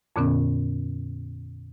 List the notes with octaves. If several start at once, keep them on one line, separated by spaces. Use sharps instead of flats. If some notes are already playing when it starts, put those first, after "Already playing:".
F2 A#2 D3 B3 C#4